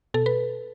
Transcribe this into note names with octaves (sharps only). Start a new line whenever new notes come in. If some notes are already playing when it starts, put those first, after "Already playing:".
B2 A4
B4